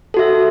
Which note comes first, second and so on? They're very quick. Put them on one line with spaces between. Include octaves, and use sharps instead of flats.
A4 F#4 E5